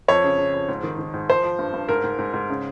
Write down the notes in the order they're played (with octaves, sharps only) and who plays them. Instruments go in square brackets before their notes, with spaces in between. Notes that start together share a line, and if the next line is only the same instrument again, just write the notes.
[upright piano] F2 C#5
C#3
C#3
F2
G#2
D#3
D#3
G#2
F3 C5
F3
G2
G2
G#2 A#4
G#2
G#2
G#2
C#3